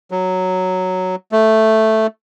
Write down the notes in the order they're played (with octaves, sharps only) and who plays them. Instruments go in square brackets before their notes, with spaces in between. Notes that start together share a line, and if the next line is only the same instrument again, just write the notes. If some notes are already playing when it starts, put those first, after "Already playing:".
[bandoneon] F#3
A3